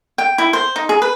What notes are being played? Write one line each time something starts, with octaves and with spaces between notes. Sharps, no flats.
G5
E4
C5
D#4
G#4
B4